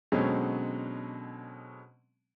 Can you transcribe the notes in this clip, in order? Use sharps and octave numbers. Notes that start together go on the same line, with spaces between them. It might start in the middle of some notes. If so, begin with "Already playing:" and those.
B2 D3 F#3 G#3 C4 C#4